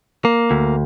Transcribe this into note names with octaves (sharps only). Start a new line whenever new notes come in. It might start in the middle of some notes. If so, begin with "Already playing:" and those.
A#3
D2